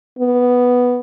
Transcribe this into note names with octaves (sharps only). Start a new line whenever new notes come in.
B3